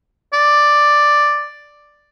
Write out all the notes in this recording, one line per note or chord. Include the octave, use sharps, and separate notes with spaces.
D5